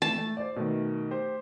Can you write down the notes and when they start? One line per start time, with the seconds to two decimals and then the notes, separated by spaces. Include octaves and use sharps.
0.02 E3 A3 A5
0.17 A3
0.37 C5 D5
0.56 B2 D#3 A3
1.11 G4 C5